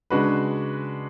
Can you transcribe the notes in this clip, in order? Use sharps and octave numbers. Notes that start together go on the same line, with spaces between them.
C#3 G#3 D4 F#4 B4